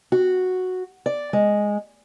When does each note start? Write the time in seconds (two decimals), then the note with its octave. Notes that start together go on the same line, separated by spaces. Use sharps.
0.12 F#4
1.06 D5
1.33 G#3